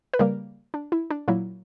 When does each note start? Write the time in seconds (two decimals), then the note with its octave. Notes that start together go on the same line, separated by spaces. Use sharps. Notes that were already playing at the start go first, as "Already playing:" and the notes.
0.14 B4
0.19 C#3 G3 A#3 A#4
0.74 D4
0.92 E4
1.10 D4
1.28 A#2 F#3 A#3 E4